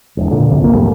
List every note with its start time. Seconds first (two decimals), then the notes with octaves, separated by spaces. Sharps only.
0.17 E1 E2
0.31 A#2 D3
0.49 E1 C2 F#2
0.60 A#1 A#3
0.73 G#1 E2 G3 A3